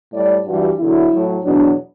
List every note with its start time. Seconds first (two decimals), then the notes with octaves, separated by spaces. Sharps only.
0.13 A2 G3 D5
0.46 G2 E3 G3 F#4
0.79 E2 D3 F#3 E4
1.12 A2 F#3
1.44 E2 B2 F#3 D4